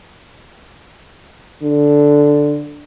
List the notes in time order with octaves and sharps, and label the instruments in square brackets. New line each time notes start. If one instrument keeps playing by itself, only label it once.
[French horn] D3